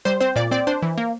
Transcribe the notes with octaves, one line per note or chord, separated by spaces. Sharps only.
G3 C5
C4 C5
A#2 D5
C4 D5
D4 C5
E3
A#3